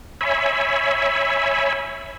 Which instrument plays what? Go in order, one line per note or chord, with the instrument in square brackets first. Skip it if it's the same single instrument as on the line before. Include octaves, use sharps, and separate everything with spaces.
[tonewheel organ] C#5 E5 G#5 B5